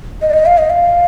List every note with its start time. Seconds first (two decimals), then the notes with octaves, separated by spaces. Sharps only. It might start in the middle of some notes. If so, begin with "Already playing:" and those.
0.22 D#5
0.30 D5
0.33 D#5
0.46 F5
0.58 D#5
0.70 F5